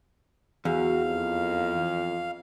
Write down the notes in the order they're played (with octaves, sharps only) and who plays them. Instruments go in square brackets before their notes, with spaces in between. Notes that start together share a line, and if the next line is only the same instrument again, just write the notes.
[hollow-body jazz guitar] E2 [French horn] F#4 [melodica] F5
[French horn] F2